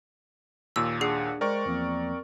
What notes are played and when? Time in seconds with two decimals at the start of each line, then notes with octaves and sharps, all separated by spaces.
0.76 D#2 A#2 E6
1.01 D4 G#4 F#5 C7
1.41 G#3 A#4 C5 D5 G5 C#6
1.66 E2 F3 A#3 C4